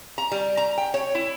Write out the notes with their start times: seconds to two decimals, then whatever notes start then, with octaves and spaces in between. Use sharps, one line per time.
0.18 A#5
0.32 G3
0.57 A#5
0.78 G5
0.94 C#5
1.15 E4